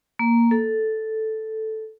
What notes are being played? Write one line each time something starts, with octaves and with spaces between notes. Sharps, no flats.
A#3
A4